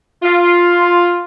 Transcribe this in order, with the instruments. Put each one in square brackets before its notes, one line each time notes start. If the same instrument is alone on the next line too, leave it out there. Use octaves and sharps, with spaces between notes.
[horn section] F4